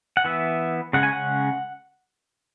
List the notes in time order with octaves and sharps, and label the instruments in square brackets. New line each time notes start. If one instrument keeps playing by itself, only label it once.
[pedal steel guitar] F#5
E3 B3 E5
C#3 G#3 C#4 F#5
G#5
F#5